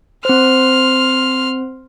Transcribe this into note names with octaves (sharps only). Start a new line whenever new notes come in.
C4 C5 C6 F6